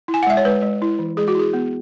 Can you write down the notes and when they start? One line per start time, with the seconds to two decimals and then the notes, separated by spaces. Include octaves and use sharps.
0.08 E4
0.14 G#5
0.23 F#5
0.27 G#3 E5
0.37 C#5
0.45 G#3 B4
0.63 G#3
0.82 E4
0.99 E3
1.17 G#3 G#4
1.28 F#4
1.35 E4 G#4
1.53 B3